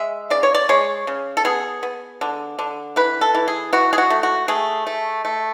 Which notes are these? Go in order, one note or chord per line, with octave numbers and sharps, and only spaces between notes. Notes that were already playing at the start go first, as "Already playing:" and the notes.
Already playing: G#3 E5
C#3 D5
C#5
D5
G#3 C#5
C#3
A4
B3 G#4
B3
D3
D3
E3 B4
A4
E3
G#4
E3 F#4
G#4
F#4
A3
F#4
A3 G#4
A3
A3